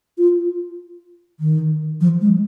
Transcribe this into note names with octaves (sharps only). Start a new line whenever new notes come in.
F4
D#3
F3
G#3